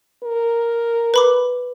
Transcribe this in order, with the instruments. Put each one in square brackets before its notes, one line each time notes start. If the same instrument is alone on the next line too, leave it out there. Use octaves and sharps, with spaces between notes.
[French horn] A#4
[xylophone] B4 B5 D6